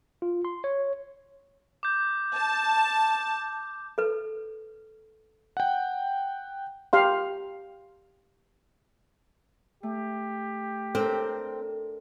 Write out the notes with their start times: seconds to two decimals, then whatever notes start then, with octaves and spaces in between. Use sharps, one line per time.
0.22 F4
0.45 C6
0.64 C#5
1.83 D6 G6
2.34 A5
3.98 A4 B4
5.57 F#5 G5
6.93 G4 F5 C6
9.83 A3 G4
10.95 C4 D4 A4 A#4